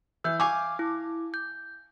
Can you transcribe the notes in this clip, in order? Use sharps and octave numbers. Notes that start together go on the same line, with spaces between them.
E3 E6 G6
F5 G#5 C#6 D6
E4
G6